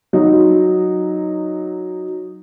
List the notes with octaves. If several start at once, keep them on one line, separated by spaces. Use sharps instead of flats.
F#3 D#4